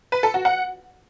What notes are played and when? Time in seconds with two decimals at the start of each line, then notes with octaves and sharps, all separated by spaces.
0.12 B4
0.23 A4
0.34 F#4
0.45 F#5